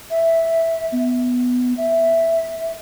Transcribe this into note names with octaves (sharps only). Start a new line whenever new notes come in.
E5
B3
E5